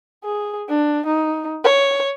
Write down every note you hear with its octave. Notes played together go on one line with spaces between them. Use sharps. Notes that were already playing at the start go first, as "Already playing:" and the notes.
G#4
D4
D#4
C#5